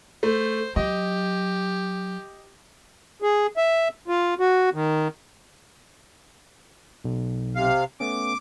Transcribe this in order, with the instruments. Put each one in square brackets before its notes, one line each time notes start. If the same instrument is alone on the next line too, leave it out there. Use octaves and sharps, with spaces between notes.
[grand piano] A3 [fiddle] C5
[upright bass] F#3 [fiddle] G4 [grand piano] D#5
[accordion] G#4
E5
F4
F#4
D#3
[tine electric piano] B1
[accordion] C3 F5
[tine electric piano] A3 B3 C#4 [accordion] D6